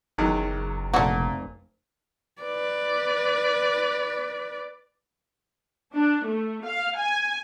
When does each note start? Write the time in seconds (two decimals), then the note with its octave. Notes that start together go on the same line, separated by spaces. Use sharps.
0.18 F#1 E2 D#3 F#3
0.93 F1 A#2 A3 F#4
2.42 B4 D5
5.93 D4
6.24 A3
6.64 F5
6.97 G#5